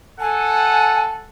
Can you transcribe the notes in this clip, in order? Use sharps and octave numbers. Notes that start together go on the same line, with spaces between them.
A4 F#5 G#5 A5